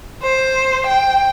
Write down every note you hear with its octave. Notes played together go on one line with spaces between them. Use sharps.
C5
G5